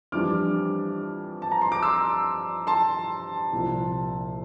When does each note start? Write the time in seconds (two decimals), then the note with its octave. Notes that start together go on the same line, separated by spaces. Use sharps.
0.12 F2 E3 G3 D4 D6 F6
1.42 A5
1.52 A#5
1.62 C6
1.72 D6
1.83 C6 E6
2.67 A5 C6
3.53 C2 A#2 F3